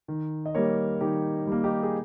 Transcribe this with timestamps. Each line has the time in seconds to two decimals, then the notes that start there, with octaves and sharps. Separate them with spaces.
0.08 D#3
0.46 D#5
0.55 G3 A#3 A#4 C#5
1.01 D#3 D#4 G4
1.47 G3 A#3
1.64 D#4 G4
1.83 G#4